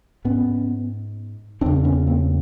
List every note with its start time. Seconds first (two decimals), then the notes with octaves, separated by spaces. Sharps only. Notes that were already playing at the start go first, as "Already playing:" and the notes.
0.25 G#2 B3 C#4
1.61 E2 C4 D4
1.66 C#3
1.84 B3 C#4
2.07 A#3 C4